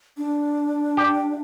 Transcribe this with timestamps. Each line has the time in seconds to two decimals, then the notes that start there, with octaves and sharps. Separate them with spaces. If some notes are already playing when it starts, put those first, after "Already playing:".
0.17 D4
0.97 G4